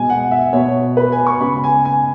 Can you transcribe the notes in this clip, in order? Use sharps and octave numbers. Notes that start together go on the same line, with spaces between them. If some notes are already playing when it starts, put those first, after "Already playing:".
Already playing: B2 G#3 B3 G#5
F#5
E5
B2 B3 C#5
B4
G#5
C#6
C#3 G#3 B3 B5
G#5
G#5